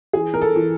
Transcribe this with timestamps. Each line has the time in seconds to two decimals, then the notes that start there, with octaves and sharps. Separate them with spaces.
0.13 E3 G#4
0.34 A#4
0.41 A4
0.56 E3